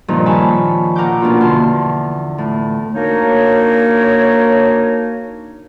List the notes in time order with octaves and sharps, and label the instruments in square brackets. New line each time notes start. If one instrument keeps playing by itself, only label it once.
[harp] G2 A#2 D#3 F3
C#5 G#5 A5 B5
A#2 A#4 F#5 D6 G6
B2 A#3 C#4 D4 F4
E2 D3 A5 C6
A2
[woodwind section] A#3 D4 D#4 F#4 A#4 C#5